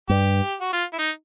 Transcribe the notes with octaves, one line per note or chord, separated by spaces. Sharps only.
G2 G4
F#4
F4
E4
D#4